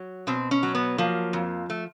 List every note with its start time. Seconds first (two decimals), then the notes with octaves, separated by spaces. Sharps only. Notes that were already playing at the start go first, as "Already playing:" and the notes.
Already playing: F#3
0.27 B2 C4
0.51 C#4
0.63 F#3
0.75 B3
0.98 F3 A#3
1.33 F2
1.70 A3